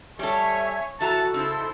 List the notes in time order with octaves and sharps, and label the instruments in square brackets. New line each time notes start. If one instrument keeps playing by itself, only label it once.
[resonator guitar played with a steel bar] G3 A4 [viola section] C#5 [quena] E5 [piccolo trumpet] G#5
[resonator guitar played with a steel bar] E3 E5 A#5 [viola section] F#4 [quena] A4 [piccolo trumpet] A5
[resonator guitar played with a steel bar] C#3 [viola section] D#4 E4 C5 [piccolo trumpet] E6